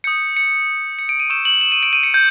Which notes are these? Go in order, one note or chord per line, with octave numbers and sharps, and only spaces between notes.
D#6 G6 C#7
C#7
C#7
D7
D#7
C#6 E6 G6 E7
F#7
E7
D#7
D7
D#7
C#7
G6